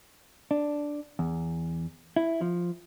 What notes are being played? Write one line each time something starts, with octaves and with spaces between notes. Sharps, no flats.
D4
E2
E4
F3